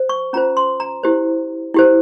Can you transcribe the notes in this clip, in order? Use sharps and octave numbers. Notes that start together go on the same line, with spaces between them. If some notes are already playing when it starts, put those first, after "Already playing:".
Already playing: C5
C#6
C#4 F4 C5 A#5
C6
A#5
E4 G4 C5
E4 G4 C5